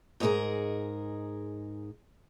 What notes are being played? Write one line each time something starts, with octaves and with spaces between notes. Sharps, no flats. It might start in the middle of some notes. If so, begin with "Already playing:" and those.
G#2 D#4 E4 F#4 G#4 A#4